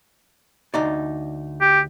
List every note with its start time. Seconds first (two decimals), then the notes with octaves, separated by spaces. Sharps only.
0.74 D2 D#4 D5
1.61 G4